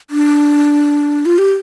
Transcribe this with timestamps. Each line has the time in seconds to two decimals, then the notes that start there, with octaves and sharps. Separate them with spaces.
0.10 D4
1.26 F4
1.38 G4